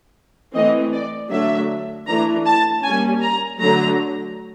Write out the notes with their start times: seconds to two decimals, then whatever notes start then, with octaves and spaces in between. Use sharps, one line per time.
0.54 E3 A3 C4 D#5
0.92 D5
1.30 D3 F#3 A3 D4 E5
2.07 E3 A3 D4 A#5
2.46 A5
2.84 G3 A#3 C#4 G#5
3.23 A#5
3.60 D3 F#3 A3 A#5